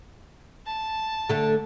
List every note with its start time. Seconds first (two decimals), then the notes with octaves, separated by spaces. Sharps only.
0.66 A5
1.29 D3 A3